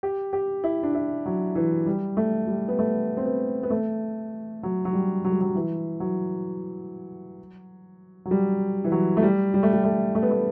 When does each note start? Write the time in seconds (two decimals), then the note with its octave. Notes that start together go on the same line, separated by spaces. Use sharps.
0.03 G4
0.33 G4
0.64 E4
0.83 D4
0.95 E4
1.26 F#3
1.55 E3
1.86 G3
2.17 A3
2.48 G3
2.68 B3
2.79 A3
3.17 C4
3.25 B3
3.63 B3
3.70 A3
4.63 F#3
4.85 F#3
4.93 G3
5.24 F#3
5.32 G3
5.41 F#3
5.55 E3
6.00 F#3
8.25 F#3
8.31 G3
8.84 E3
8.92 F#3
9.17 A3
9.22 G3
9.54 G3
9.63 A3
9.73 G3
9.84 A3
10.15 A3
10.23 B3
10.31 A3